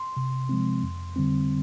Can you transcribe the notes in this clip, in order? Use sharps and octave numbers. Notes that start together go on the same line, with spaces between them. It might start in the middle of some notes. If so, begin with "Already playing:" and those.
Already playing: C6
C3
F3 G#3 C4
F2
D3 G3 C4